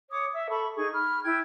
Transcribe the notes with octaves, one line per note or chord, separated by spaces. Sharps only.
C#5 D6 D#6
E5 E6
A4 B5 C#6
D#4 G#4 C#6
B5 F6
E4 G5 G#6